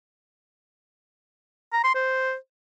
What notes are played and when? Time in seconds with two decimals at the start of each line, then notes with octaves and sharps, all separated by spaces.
1.73 A#5
1.84 C6
1.95 C5